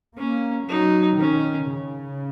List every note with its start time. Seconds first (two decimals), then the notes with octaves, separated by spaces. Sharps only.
0.17 A#3 C#4
0.68 F#3 D#4
1.19 D#3 C#4
1.71 C#3